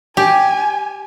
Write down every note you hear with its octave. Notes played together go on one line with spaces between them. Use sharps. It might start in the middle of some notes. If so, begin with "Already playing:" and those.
G4 G#5